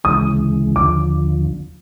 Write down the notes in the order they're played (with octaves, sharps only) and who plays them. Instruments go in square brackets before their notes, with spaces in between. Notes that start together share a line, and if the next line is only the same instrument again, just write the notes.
[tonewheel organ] D2 C#3 E3 G#3 [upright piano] D#6
[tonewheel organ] D#2 D3 F3 [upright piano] D6